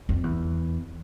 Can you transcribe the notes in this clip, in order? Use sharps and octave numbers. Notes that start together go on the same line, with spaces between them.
F2
E2